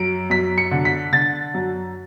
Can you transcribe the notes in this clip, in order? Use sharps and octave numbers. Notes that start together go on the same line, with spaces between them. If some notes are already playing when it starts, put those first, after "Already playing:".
Already playing: F#2 D7
F#2 B6
C#7
D3
B6
D3 A6
F#2